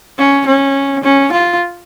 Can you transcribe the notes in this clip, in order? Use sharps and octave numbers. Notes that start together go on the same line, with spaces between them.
C#4
C#4
C#4
F4